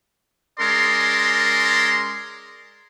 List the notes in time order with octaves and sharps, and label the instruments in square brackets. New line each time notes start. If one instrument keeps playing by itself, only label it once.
[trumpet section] G#3 C#4 A#4 D5 C6